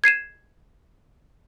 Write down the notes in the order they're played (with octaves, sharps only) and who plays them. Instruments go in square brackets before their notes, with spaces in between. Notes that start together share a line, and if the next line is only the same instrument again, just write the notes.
[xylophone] G#6 C7 D#7 E7